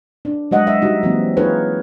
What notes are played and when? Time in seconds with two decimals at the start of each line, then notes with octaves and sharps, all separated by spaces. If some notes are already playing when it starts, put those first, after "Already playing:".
0.25 D4
0.51 F#3 G#3 D#5 F#5
0.67 E5
0.82 F#3 G3 D#4 F#4
1.03 E3 F#3 A#3 C4
1.37 D#4 F4 G#4 A#4 B4 C#5